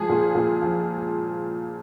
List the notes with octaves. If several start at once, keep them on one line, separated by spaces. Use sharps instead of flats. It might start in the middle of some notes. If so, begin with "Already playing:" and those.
Already playing: F3 G#3 G#4
A#2
A#2
F3